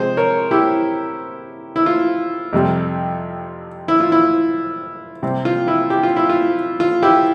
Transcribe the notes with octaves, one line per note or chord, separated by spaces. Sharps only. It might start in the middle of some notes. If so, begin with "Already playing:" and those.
Already playing: C3 F3 G#3 C4 G#4 C5
A#4 C#5
E4 G4
E4
F4
F2 C3 G3
E4
F4
E4
C3 G3 C4
F4
E4
G4
F4
E4
F4
F4
E4 G4